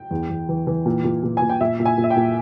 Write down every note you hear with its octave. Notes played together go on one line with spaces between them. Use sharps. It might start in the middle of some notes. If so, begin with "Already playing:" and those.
Already playing: G5
E2
E2
E3
E3
A#2
A#2
A#2
A#2 G#5
G5
A#2 E5
A#2
G#5
A#2
E5
G5
A#2